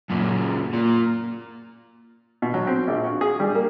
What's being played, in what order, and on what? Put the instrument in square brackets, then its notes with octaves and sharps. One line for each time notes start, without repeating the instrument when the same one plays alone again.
[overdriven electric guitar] F#2 A#2
A#2
[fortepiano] B2
F#3
C4
A#1
F#4
G#4
G3
A#3